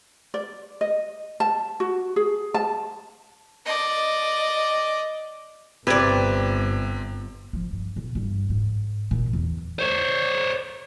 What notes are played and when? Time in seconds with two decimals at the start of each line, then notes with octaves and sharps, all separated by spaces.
0.34 D5
0.81 D#5
1.40 A5
1.80 F#4
2.16 G#4
2.54 A5
3.66 D5 D#5
5.87 G1 C3 C4 B4 D5 G#6
7.53 F3
7.72 G2
7.96 B2
8.15 G2
8.50 G#2
9.11 A#2
9.33 E2
9.79 C5 C#5